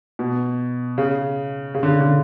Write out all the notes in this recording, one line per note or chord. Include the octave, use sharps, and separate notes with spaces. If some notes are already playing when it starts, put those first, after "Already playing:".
B2
C#3
C#3
D3
C#3
D3